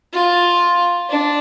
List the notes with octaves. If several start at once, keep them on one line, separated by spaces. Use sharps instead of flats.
F4
D4